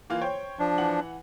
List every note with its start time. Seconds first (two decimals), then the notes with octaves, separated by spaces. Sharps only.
0.10 E3 A#3 F4
0.21 C5 C#5 G5
0.59 F3 D4
0.78 E3 F#5 F#7